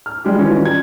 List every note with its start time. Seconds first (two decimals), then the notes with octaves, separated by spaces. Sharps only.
0.06 F6
0.24 G3 G#3 D4 G4
0.39 D#3 E3 G3 C#4 F4
0.65 G#6